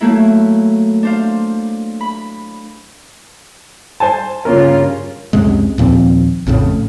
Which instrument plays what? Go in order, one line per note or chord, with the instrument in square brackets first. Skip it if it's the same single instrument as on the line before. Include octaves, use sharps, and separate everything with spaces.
[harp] F#3 A3 A#3 E4
D4 C5 F5
B5
[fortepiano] C5 G#5 A5
[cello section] G2 C#3 F4 [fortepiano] A#3 C#4 A#4
[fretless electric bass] C#2 F#2 C3 G#3
D#2 A#2 F3 C4
A1 F2 A2 C#3